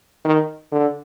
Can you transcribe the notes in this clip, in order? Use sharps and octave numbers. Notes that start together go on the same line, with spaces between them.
D#3
D3